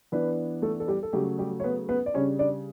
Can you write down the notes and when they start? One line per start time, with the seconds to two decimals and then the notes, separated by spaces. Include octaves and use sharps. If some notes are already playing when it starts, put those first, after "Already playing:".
0.12 E3 B3 D4 B4
0.62 A3 A4
0.80 A4
0.88 G3 G4
1.03 A4
1.13 C#3 F#3 G3 A3 G4
1.39 G3 G4
1.60 C#5
1.64 B3 B4
1.89 B3 B4
2.06 D5
2.14 C#3 G3 C#4 D4 C#5
2.39 D4 D5